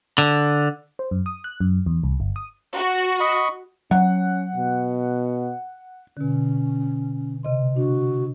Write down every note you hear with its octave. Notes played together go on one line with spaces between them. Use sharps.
D3
C5
F#2
D#6
F#6
F#2
E2
C2
G1
D#6
F#4
D#5 B5 C#6
F#3 C#4 F#5
B2
B2 D3 C#4
C3 D#5 C6
D4 F#4